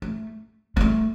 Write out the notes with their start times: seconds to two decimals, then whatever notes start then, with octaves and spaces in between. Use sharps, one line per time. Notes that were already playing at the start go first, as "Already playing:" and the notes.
0.02 A3
0.77 A#3
0.81 A3